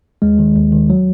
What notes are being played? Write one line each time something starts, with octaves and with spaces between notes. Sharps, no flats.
D#2 G#3
D#3
D#2
D#3
F#3